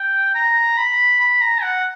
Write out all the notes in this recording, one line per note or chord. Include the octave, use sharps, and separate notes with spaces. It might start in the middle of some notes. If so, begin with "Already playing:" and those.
Already playing: G5
A#5
B5
B5
A#5
F#5